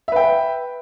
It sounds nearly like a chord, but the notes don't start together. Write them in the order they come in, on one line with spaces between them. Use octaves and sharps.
E5 B4 G5